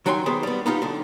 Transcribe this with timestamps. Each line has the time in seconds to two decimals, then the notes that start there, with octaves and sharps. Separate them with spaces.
0.06 D#3 F#3 D#4 G5 G#5 C6
0.26 D#3 B3 G4 G#4 C5
0.43 G3 B3
0.66 B3 D#4 F4 G4
0.82 B1 D3